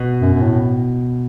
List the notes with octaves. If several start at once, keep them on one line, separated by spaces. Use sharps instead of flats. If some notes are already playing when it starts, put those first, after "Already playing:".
Already playing: B2
F#2
F#2
A2